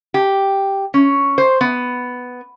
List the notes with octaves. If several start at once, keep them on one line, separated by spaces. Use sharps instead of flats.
G4
C#4
C5
B3